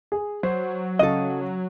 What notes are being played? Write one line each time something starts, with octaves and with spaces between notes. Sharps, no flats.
G#4
F#3 C5
C#3 A4 D#5 F5 D#7